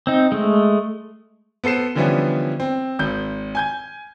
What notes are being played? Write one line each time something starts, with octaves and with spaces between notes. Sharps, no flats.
C4 D#4
G#3 A3
B3 A4 C5 C7 E7
D3 E3 F3 G3 B3 C#4
C4
G#1 G6
G#5 G6 G#6